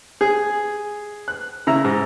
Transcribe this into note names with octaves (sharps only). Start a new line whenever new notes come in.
G#4
F#6
C#3 E4 A#5 E6
G#2